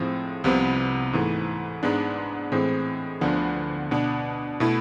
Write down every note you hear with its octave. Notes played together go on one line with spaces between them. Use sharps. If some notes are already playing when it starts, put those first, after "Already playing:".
Already playing: A2 F3 G#3 C4
C2 C3 F3 B3
G#2 E3 A3
G#2 G#3 B3 D4
A2 E3 G#3 C4
D2 D3 F3 B3 D4
B2 B3 D4
B2 A3 E4